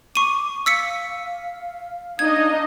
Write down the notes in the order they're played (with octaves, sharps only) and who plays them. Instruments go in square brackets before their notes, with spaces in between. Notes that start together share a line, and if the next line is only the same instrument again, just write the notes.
[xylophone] C#6 D#7 [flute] D6
[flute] F5 [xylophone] E6 B6 C#7
[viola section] D4 D#4 D#5 [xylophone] G#6